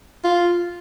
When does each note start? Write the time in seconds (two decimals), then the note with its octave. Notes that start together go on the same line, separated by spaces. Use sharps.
0.24 F4